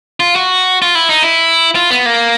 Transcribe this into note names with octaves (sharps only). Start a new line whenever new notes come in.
F4
F#4
F4
E4
D#4
E4
F4
B3
A#3